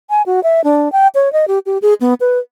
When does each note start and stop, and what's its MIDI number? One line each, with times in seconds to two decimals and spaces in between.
0.10 0.22 80
0.26 0.42 66
0.43 0.63 76
0.64 0.91 62
0.92 1.08 79
1.15 1.31 73
1.33 1.45 75
1.48 1.59 67
1.66 1.78 67
1.82 1.94 68
2.01 2.14 59
2.21 2.38 71